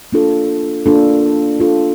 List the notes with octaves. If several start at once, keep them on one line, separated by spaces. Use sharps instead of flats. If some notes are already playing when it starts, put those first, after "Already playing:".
A#3 D4 F4 A4
A#3 D4 F4 A4
A#3 D4 F4 A4